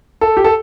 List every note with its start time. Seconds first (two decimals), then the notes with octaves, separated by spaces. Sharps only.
0.21 A4
0.37 G4
0.44 A4